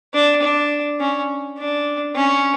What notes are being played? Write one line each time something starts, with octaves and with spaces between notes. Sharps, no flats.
D4
D4
C#4
D4
C#4